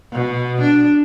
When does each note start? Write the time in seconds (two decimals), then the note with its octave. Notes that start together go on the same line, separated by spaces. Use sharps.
0.12 B2
0.62 D4